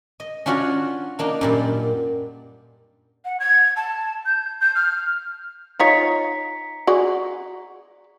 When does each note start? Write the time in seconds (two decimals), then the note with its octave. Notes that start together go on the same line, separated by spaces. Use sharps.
0.20 D#5
0.46 C#4 D4 F4 F#4 C#5
1.19 A#3 D4 D#4
1.41 F#2 A#2 G3
3.25 F#5
3.40 G#6
3.76 A5
4.25 G6
4.60 G6
4.75 F6
5.79 D#4 F4 C#5 A#5 B6 C#7
6.87 F#4 G#4 D5